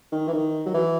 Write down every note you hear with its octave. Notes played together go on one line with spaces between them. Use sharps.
D#3
E3
D#3
F#3
E3